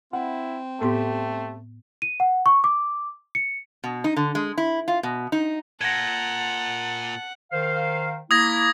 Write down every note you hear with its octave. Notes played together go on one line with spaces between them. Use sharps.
C4 E4 F#5
A2 A3 B3 G4 A4 C6
D#7
F#5
C#6
D6
C#7
B2
D#4
D3
G#3
E4
F4
B2
D#4
A#2 F#5 A5 G#6 A#6
D#3 C5 F5
A#3 E4 D#6 G#6 A#6